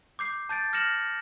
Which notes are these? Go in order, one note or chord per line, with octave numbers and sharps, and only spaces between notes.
D6 G6 C7
A5 G6 A6 D7
F6 A#6 C#7 E7 F#7